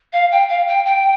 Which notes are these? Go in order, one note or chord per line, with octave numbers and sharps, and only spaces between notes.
F5
G5
F5
G5
G5